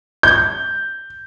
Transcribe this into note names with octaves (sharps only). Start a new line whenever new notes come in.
G6